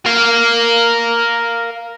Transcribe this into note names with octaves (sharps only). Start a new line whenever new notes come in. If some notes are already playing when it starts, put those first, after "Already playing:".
A#4 F5